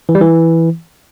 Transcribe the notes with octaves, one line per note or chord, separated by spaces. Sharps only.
E3
G3
E3